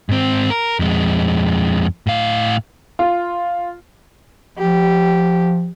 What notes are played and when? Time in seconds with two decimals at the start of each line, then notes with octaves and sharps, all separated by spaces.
0.09 G#2 C4
0.50 A#4
0.79 F2 G#3
2.07 A2 F5
2.99 F4
4.58 F3 G4